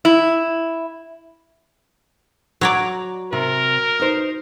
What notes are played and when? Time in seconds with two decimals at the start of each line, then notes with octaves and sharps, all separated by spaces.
0.05 E4
2.61 F#3 C#5 D5 A#5
3.33 C3 A#4
4.00 D#4 C5